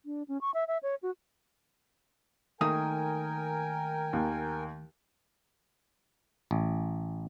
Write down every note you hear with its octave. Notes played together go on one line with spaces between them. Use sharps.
D4
C#4
C#6
E5
E5
C#5
F#4
D#3 A3 A#3 A#4 G5 G#5 D#6
D#2
A1